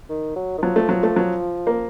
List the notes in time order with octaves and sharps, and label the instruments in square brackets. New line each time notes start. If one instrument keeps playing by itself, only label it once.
[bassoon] D#3
F#3
D#3
[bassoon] F3 [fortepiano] F#3
[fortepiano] A3
F#3
A3
F#3
A#3